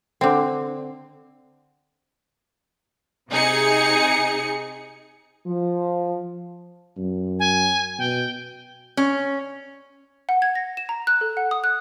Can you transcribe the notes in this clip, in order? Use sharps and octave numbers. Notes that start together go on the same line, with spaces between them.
D3 C4
C3 D#4 G#4 C#7
F3
F#2
G#5
B2 G5
C#4
F#5
G#6
A#6
E7
A#5
F#6
A4
F#5
D#6
F#6